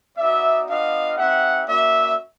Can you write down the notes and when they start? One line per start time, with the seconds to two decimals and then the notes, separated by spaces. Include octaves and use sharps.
0.18 B3 D#4 F#4 D5 E5
0.68 B3 D4 F4 D#5 F5
1.17 C4 D#4 G4 E5 F#5
1.67 A#3 C#4 F#4 D5 E5